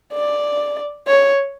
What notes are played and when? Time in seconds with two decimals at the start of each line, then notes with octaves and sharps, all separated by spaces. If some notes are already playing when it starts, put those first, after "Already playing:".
0.13 D5
1.07 C#5